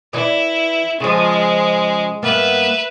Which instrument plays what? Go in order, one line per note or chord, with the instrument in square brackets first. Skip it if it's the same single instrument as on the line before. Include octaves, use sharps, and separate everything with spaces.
[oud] E3 D5 [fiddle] E4
[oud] C#3 F3 [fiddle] G#3
[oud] G2 A#3 B3 [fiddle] B4 E5